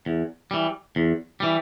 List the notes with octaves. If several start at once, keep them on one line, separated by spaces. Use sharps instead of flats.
E2
E3 G3
E2
E3 G3